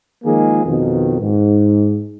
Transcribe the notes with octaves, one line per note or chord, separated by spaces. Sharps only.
D#3 F3 G#3 A#3 G#4
F2 B2 D#3
G#2